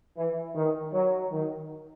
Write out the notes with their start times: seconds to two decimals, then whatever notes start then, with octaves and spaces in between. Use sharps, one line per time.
0.17 E3
0.55 D#3
0.93 F#3
1.32 D#3